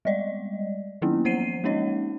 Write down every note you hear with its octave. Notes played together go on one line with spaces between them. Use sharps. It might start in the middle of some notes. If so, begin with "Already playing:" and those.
G3 G#3 D5 D#5
D#3 F#3 A#3 B3 C#4 E4
F3 C5 F#5 C7 D#7
G#3 A#3 C#4 D#4 C#5 D#5